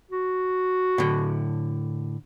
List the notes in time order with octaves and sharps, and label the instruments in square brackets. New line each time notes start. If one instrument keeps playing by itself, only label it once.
[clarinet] F#4
[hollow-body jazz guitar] A2 D3